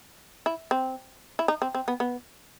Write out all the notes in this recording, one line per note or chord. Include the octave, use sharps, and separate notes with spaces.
E4
C4
E4
D#4
C4
C4
B3
B3